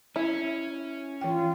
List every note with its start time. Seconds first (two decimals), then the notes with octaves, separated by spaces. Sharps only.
0.16 C#4 E4
1.21 E3 F4 G5